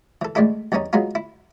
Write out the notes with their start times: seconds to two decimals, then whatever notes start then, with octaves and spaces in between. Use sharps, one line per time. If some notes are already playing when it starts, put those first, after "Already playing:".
0.22 E3 A4
0.35 A1 G#3 A3 D4 E4 A4
0.72 E2 G2 E3 C#4 D#4
0.93 F#3 G#3 B3 D#4 F4
1.15 E4